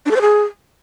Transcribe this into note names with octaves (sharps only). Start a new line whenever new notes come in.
D4
A4
C5
G#4